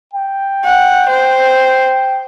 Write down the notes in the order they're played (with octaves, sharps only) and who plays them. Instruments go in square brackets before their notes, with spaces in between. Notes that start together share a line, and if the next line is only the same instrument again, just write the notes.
[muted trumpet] G5
[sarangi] F#5
C5